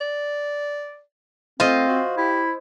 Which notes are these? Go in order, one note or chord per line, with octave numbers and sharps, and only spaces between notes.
D5
A3 C4 F4 C5 D#5
F#4
E4 G4